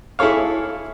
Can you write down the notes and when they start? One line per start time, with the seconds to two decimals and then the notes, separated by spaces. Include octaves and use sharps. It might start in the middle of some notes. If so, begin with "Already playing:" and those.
0.19 E4 G#4 A4 C#5 F5